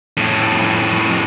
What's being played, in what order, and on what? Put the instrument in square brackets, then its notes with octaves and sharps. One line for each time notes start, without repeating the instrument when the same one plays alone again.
[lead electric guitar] F2 A2